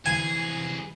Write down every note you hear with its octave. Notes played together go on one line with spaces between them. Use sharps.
C2 E3 G#4 G#5